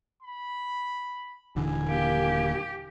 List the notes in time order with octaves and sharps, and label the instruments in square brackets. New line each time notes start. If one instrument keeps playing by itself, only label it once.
[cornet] B5
[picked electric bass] D#1 D3 E3 [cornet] G#5
[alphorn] A#3 [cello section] G4